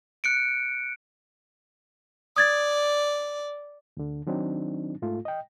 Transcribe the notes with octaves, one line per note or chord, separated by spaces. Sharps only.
F#6 C#7 D7
D5 D#6 G#6 A6
D2 D3
D#3 F#3 C4 D4 D#4
G#2 A3 F4
D#5 G5